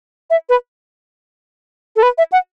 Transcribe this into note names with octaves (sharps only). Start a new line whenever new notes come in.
E5
B4
A4
B4
E5
F#5